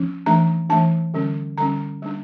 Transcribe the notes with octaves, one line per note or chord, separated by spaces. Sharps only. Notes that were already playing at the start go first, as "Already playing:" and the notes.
Already playing: F3 C#4
E3 A3 D4 A#5
E3 A3 D4 A5
D3 G3 C#4
D3 G3 C#4 A#5
G3 A#3 D4